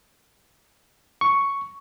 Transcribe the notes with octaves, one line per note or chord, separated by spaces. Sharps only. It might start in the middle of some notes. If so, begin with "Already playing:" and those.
C#6